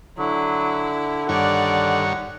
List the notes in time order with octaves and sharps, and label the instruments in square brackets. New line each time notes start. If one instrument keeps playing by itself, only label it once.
[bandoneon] D3 [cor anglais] F#3 [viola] E4
[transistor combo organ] G2 D#3 C#5 [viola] D5 [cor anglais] F#5